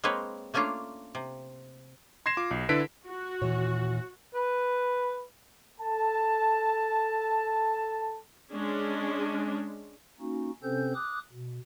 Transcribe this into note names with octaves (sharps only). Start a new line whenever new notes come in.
G#3 A#3 C4 B4 C#5
A3 A#3 C#4 D4 F4
C3
C6 G#6 A#6 C7 E7
F4 D6
B1
D3 E4 A4 B4 B6 D7
F#4
D#2 A#2 E3 C#5
B4
A4 A5
G#3 C#4 D4
A#3 C#4 D#4 F#4
C3 C4 C#4 A4 C5 G6
D6 D#6 F#6
B2